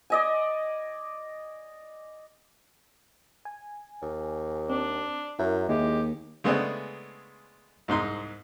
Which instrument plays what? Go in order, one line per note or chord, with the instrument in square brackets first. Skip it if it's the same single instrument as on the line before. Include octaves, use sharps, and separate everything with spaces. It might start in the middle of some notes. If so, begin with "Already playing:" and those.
[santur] D5 D#5 G#5
[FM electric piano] G#5
[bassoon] D#2
[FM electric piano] C4 [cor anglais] D4
[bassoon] F#2 [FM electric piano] E4 A#4 E5
[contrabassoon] D#2 [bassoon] G#3 [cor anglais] G4
[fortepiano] C#3 G#3 A3 B3 C4 D4
C2 G#2 D#4 C6